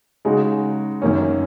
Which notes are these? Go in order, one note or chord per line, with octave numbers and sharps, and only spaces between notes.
C#3 G#3 D#4 F#4
F#2 D#3 A#3 C#4